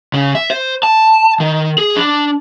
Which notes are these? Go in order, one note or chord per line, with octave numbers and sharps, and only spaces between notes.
C#3
E5
C5
A5
D#3
G#4
D4